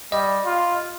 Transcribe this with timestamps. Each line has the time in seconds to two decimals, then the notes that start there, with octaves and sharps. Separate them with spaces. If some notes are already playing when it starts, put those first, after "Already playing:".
0.12 G3 D#5
0.45 F4